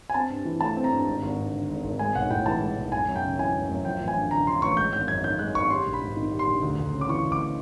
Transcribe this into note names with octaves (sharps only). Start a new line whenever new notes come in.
G#5
C4 A5
G2
E3
A3 A5
C4
A#5
G2
G#1
G#1
G2
D3
G#1
G#1
G#3 G#5
B1 F#5
A2 G5
E3 A5
G#3
B1
F#2 G#5
F#2
G5
C#3
E3 G#5
F#2
F#2
F3 G5
A1
G#5
G2
D3 A#5
F3 C6
A1 C#6
G#3 G6
G#1 G6
F#2 G#6
D#3 G6
G#3 F#6
G#1 C#6
G3 C6
A#1
B5
G#2
D#3
G3
C6
A#1
D2
D2
C#3
D6
E3 C#6
D2
D6